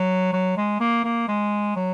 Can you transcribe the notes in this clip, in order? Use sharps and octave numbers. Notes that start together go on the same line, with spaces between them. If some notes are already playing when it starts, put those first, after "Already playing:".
Already playing: F#3
F#3
G#3
A#3
A#3
G#3
F#3